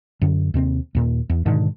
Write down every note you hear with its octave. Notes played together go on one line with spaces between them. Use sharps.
F#2 D3
D#2 C3 C4
D#2 A#2
E2
G#2 B2 D3 D#3